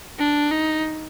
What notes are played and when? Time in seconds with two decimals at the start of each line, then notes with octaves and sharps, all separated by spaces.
0.19 D4
0.51 D#4